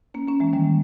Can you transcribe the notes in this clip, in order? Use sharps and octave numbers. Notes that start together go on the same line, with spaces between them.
A#3 C#4
A#3 C#4
E3 G#3
D#3 G3